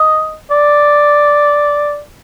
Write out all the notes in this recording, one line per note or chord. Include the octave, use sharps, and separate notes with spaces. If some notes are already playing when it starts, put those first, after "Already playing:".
Already playing: D#5
D5